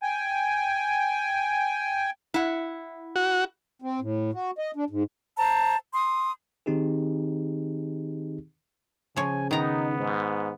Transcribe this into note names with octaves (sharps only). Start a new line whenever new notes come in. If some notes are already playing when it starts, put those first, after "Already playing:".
G5 G#5
E4 F#5
F#4
C4
A2
F#4
D#5
D4
G#2
C5 A5 A#5
C6 D#6
D#3 C4 D#4 G4 G#4
C#3 F3 C#5 G#5
D#3 B3 D#4 A#5
G#2